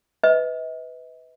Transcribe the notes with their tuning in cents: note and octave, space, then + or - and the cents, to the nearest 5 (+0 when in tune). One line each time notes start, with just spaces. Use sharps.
B4 +10 D#5 +45